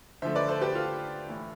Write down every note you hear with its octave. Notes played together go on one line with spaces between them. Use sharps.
D3 F3 A3 C5 E5
B4 D5
A4 C5
G4 B4
F4 A4
A2 E3 A3